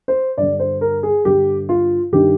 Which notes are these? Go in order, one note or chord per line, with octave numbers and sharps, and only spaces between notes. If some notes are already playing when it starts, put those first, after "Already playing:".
C5
G2 D3 D5
C5
A#4
G#4
G2 D3 G4
F4
G2 D#3 G4